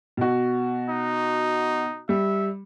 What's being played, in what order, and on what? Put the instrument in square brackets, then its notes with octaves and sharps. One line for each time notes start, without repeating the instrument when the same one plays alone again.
[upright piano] B2 F#4
[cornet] D#4
[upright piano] G3 [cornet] E5